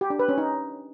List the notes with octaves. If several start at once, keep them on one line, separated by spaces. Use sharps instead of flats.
G4
D4
B4
C#4
D#4